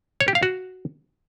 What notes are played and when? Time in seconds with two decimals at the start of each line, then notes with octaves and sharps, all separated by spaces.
0.20 C#5
0.28 G4
0.35 F5
0.43 F#4